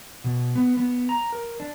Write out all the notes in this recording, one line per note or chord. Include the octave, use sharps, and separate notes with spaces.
B2
B3
B3
A#5
A#4
D4